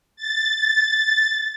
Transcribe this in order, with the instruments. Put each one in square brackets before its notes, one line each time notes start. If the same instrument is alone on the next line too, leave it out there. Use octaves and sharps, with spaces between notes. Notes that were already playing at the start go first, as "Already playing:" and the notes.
[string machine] A6